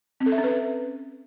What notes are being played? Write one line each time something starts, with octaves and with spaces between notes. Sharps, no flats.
C4
A4
E5
C#4
B4